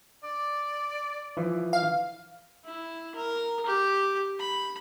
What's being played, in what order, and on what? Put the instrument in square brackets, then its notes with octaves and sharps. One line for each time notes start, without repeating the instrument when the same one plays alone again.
[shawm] D5
[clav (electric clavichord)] E3 F3
[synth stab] F5
[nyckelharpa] E4
A#4
G4
B5